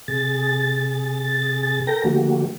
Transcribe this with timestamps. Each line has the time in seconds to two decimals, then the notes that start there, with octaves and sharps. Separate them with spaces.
0.08 C3 G#4 A6
1.87 A4 A#4 G5 A#6
2.04 D3 F3 A3 A#3 F#4 G4